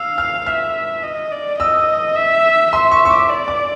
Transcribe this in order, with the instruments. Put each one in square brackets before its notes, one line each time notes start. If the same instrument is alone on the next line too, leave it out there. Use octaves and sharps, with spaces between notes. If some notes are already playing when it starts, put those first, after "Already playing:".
Already playing: [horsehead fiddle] F5 [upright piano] E6
[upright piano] F6
[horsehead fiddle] E5 [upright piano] F6
[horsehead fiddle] D#5
D5
[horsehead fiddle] D#5 [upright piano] E6
[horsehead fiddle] E5
[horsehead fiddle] E5 [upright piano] C6
[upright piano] C#6
C#6
D6
[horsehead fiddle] D5
[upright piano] D6